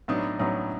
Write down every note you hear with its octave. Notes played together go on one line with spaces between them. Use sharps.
A2 F#3 B3 D4 D#4
A2 F#3 B3 C#4 D#4